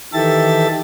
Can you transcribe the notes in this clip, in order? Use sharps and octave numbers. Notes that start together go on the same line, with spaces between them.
D#3 E3 G4 A4 E5 A6